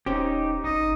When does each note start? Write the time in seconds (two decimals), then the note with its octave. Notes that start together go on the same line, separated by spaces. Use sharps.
0.06 D#1 C#4 D#4 G4 C5
0.64 G#1 D#4 D#5